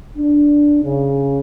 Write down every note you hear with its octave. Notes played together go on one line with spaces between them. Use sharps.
D4
C#3